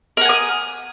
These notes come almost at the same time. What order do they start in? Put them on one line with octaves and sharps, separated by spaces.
A#4 F#5 G#5 D#6